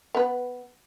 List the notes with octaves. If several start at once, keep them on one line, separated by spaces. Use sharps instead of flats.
B3 B4